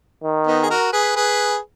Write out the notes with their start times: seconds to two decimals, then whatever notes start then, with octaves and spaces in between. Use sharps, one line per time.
0.24 D#3
0.47 B3 D#4
0.63 G#4
0.70 F#4 A#4
0.93 G#4 B4
1.16 G#4 B4